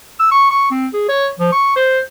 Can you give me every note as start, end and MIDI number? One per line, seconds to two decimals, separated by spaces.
0.20 0.31 88
0.31 0.48 85
0.51 0.68 85
0.71 0.87 60
0.93 1.08 68
1.09 1.28 73
1.39 1.51 53
1.52 1.75 85
1.76 2.00 72